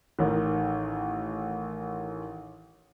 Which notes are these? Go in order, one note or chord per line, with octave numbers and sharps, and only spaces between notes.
A1 D#3